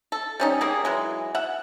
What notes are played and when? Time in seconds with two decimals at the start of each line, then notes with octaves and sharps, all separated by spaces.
0.12 A4
0.40 G3 C#4 D#4
0.61 G3 A#3 G#4
0.85 E3 F#3 G#3
1.35 E5 F#5